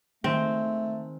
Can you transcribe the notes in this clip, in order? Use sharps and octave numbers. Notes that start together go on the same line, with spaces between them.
D#3 G#3 A3 C4